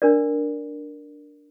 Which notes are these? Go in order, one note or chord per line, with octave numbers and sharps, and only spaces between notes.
D4 A#4 D5